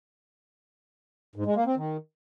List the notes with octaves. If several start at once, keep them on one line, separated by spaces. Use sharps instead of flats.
G#2
G#3
A#3
C4
D#3